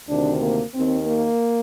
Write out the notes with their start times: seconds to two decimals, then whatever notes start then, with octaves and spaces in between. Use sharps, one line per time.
0.08 D2 C3 D#3 D4
0.42 A#3
0.74 D#2 D#3 C4
1.07 A#3